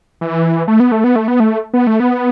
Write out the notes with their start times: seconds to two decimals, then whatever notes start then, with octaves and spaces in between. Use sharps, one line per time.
0.21 E3
0.68 A3
0.80 B3
0.92 A3
1.04 B3
1.16 A3
1.28 B3
1.40 A3
1.73 B3
1.87 A3
2.00 B3